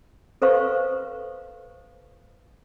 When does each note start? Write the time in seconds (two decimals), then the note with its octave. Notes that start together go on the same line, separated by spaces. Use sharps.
0.42 A4 B4 C5 F5 C#6